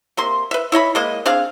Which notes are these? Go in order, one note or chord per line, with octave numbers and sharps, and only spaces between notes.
C3 A#3 C6
B4 E5
E4 C#5 D#5 B5
G#3 A#3 D#5
C4 D4 G#4 F5